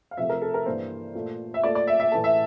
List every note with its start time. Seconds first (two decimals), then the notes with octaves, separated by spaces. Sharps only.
0.11 F5
0.17 C3 F3 A3 E5
0.30 A#4
0.42 A4
0.54 A#4
0.66 G2 E3 A#3 C5
1.15 A#2 A3
1.54 E5
1.63 A#2 A3 D5
1.75 D5
1.87 E5
2.00 E5
2.12 A2 E3 A3 A5
2.24 E5